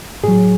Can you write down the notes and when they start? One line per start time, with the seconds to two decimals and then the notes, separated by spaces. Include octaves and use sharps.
0.24 A2 F#3 G#4